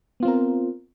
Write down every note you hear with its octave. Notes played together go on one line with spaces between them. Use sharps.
B3 C4 F4 A#4